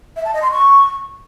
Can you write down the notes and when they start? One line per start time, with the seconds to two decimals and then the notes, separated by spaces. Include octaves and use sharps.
0.16 E5
0.25 A5
0.34 D#5
0.42 C6
0.51 C#6